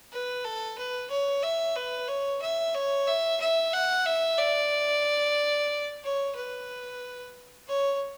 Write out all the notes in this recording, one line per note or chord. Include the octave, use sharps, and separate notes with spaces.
B4
A4
B4
C#5
E5
B4
C#5
E5
C#5
E5
E5
F#5
E5
D5
C#5
B4
C#5